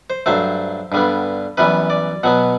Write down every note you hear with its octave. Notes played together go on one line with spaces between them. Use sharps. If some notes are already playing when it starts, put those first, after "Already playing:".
C5
G2 F#3 A3 C5
G2 D3 G3 B3
F#2 E3 G3 B3 B4
D5
B2 F#3 B3 F#5